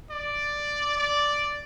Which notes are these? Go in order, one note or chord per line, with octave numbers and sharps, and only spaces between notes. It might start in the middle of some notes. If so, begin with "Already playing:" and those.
D5
D5